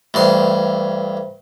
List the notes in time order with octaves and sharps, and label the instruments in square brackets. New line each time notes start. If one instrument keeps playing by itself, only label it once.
[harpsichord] A1 G2 C6 [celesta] C5 E5